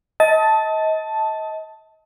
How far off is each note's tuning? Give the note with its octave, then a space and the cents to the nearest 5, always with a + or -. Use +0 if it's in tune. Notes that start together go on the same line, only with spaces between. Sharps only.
D#5 +35 A5 +0